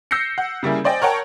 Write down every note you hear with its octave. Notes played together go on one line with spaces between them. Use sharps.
E6 G6 A#6 C7 C#7
F#5
C#3 G3 A#3 E4 G#4
C5 D5 D#5 G5 G#5
A#4 C#5 F#5 G5 A5